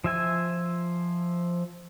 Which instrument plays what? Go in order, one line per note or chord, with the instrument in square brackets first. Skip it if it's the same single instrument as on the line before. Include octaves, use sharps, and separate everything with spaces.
[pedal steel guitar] F3 E5 G#5